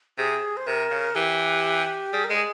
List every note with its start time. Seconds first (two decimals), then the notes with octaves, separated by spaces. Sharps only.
0.18 C3 G#4
0.57 C5
0.67 C3 A#4
0.91 C#3
1.15 E3 G4
2.13 G3 G#4
2.24 A#4
2.30 G#3 G#4